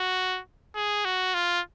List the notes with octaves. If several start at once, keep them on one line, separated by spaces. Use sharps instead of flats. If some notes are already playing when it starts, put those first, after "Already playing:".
Already playing: F#4
G#4
F#4
F4